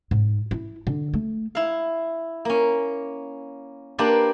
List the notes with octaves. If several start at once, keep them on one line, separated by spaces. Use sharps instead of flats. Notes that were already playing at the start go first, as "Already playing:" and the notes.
G#2
E4
D3
A3
E4 F5
A#3 C#4
A#3 D4 G4 B4 C5 D5